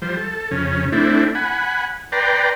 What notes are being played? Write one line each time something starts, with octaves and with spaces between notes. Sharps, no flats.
F3 G3 C5
A4
F2 C#3 C#4
A3 C4 D4 E4
F#5 G#5 B5
B4 D5 G5 A#5 C6